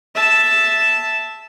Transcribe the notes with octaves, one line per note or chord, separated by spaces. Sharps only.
E5 A5